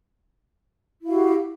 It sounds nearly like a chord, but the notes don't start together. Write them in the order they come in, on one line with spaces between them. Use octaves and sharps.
E4 F5 F#4 G4